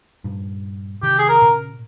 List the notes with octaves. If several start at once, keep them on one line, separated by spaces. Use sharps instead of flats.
G2 A#2
C3 D#3 G4
G#4
A#4
A#2 C#3